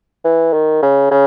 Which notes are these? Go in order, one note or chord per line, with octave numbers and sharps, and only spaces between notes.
E3
D#3
C#3
C#3